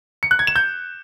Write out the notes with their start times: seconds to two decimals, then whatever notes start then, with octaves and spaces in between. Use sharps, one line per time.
0.23 C#7
0.31 F#6
0.39 G#6
0.47 E7
0.56 G6